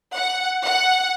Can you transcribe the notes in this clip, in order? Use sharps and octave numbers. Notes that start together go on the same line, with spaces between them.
F#5
F#5